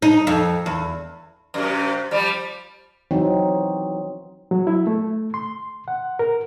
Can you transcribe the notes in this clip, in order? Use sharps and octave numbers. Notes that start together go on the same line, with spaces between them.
D#4
F2
E2
F#2 C3
F3 G3
E3 F#3 C4 D#4
F#3
E4
A3
C6
F#5
A#4